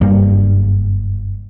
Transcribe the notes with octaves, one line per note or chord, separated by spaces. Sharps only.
F#1 G2 G3 A#3